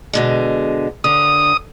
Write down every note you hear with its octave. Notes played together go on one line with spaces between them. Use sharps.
B2 D3 G#3
D3 D#6